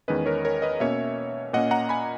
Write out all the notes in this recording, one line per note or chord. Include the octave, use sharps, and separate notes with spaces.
E2 D#3 G#3 C#4 B4 D#5
A#4 C#5
A#4 C#5
B4 D#5
B2 A#3 C#4 C#5 E5
A#2 A#3 C#4 D#5 F#5
F#5 A#5
G#5 B5